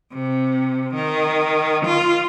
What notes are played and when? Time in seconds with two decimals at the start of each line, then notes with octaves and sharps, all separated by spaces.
0.13 C3
0.95 D#3
1.86 F4